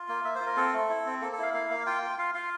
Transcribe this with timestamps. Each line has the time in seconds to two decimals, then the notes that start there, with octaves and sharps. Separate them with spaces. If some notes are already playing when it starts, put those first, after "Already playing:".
Already playing: F4
0.09 A#3
0.24 A#3 E5
0.35 C5
0.41 F4
0.46 A#4
0.56 C4 A4
0.73 A3
0.89 E4
1.06 C4
1.21 A#3 A4
1.32 A4
1.38 E4 F5
1.54 A#3 F5
1.70 A#3
1.86 F4 G5
2.03 F4
2.18 F4 F5
2.35 F4 F5